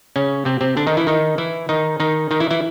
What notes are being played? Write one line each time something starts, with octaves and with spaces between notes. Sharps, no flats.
C#3 C#4
C3 C4
C3 C4
D3 D4
D#3 D#4
E3 E4
D#3 D#4
E3 E4
D#3 D#4
D#3 D#4
D#3 D#4
E3 E4
E3 E4